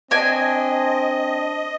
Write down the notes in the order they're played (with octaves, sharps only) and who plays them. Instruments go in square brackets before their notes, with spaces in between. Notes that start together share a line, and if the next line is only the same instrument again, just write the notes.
[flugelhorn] C4 [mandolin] D4 G#5 [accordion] D#5